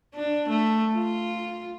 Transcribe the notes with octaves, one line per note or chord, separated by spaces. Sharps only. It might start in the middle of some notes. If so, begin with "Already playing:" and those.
D4
A3
F4